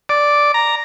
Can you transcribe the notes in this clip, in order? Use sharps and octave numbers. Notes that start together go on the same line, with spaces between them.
D5
A#5